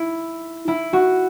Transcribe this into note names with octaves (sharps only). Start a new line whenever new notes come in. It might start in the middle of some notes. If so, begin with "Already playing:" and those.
Already playing: E4
E4
F#4